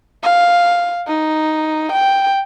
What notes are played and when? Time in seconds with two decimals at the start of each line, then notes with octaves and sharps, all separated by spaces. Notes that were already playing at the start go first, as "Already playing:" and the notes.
0.23 F5
1.08 D#4
1.92 G5